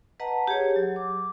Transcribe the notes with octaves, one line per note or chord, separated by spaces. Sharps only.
B4 D#5 F#5 A5 A#5
G4 G#4 C#5
F#3
D6